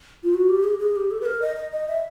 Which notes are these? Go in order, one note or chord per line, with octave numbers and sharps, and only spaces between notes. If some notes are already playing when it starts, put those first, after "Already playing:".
F4
F#4
G4
G#4
G#4
G4
A4
B4
A#4
D#5
D#5
D#5
E5